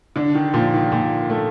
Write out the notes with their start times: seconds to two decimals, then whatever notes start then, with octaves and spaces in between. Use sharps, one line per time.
0.16 D3 D4
0.35 D#3
0.54 A#2 F3
0.74 D#3
0.92 A#2
1.30 A3